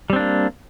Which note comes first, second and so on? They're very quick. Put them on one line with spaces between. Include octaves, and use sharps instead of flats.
G3 C4 D4 A#3